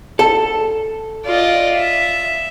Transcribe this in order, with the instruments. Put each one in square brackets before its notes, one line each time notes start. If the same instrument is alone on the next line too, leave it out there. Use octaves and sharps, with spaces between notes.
[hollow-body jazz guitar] A4
[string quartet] F4 D5 D#5
E5